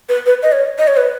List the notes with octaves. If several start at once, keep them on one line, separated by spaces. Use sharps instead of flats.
B4
B4
D#5
C#5
D#5
C#5
B4